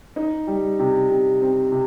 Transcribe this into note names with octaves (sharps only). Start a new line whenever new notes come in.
D#4
G3
C3
C3
C4
C3